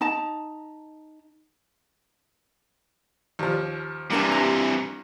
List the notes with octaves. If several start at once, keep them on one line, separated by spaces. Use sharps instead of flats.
D#4 A5 A#5
D#2 F3
C3 E3 G3 A#3 D4
G2 A#5